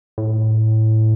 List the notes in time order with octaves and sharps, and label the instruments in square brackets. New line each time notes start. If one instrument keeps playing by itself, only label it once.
[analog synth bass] A2